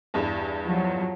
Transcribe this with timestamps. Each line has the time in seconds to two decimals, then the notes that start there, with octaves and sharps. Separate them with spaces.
0.14 E2 G2
0.65 F3 F#3